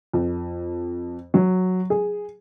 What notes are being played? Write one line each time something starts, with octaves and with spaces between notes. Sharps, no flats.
F2
F#3
G#4